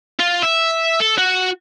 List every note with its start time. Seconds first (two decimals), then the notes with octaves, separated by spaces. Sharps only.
0.20 F4
0.43 E5
1.00 A4
1.18 F#4